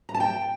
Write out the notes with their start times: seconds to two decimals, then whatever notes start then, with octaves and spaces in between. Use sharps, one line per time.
0.09 A#5
0.14 A5
0.20 G5